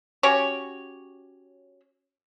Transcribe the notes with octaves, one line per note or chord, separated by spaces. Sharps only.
C#4 F#4 G4 C#5